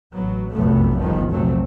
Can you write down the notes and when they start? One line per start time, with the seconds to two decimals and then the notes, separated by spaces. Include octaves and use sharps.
0.13 A1 F#3 B3
0.52 F1 B1 F#2 C3 A3 B3
0.98 G1 C#2 D#3 F3 G3 B3
1.30 F1 B1 A#2 F#3 A3 C4